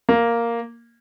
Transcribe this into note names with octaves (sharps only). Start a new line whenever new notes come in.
A#3